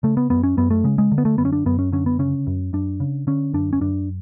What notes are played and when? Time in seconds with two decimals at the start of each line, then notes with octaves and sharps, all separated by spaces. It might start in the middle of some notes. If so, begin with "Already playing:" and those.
0.03 C#3 A3
0.17 B3
0.30 F#2 B3
0.43 C#4
0.57 F#2 B3
0.70 A3
0.84 C#3 G#3
0.98 G#3
1.12 D3
1.18 B3
1.25 A3
1.38 F#2 B3
1.45 C#4
1.53 D4
1.66 F#2 B3
1.79 C#4
1.92 D3 C#4
2.06 B3
2.19 C#3 C#4
2.47 F#2
2.73 F#2 D4
3.00 C#3
3.27 D3 C#4
3.54 F#2 D4
3.73 C#4
3.81 F#2 D4